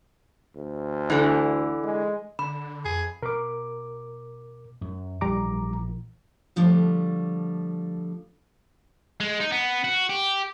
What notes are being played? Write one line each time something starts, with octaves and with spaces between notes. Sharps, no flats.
D2
D3 E3
G#3
D3 B5
F2 G#4
B2 A#4 D6
F#2
A#1 E3 G3 A#5 D6
D3 F3 G3 A3
G#3
D#4
B3
F#4
G4